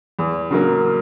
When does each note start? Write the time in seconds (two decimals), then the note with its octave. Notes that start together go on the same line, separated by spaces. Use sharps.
0.19 E2
0.50 C#3 F#3 A#3